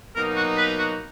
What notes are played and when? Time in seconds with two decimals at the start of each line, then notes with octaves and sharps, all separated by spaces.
0.15 B2 F#3 A#3 D#4 A#4
0.36 F#4
0.57 B4
0.78 F#4